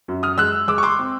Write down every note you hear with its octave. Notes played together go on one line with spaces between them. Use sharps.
F#2
D#6 F6
G#3 E6 F#6
G#3 D6 E6
C#6
C6 D6
C4